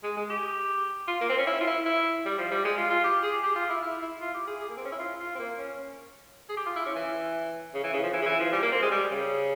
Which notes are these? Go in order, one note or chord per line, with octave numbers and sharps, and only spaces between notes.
G#3
G#3
G4
F4
A#3
C4
C#4
E4
F4
E4
E4
G3
F3
G3
G#3
F4
F4
G4
G#4
G4
F4
E4
E4
E4
F4
G4
G#4
G#4
A#3
C4
C#4
E4
F4
F4
C4
A#3
C#4
G#4
G4
F4
E4
C#4
E3
C#3
E3
C#3
F3
E3
C#3
E3
F3
G3
A#3
C4
G#3
G3
C#3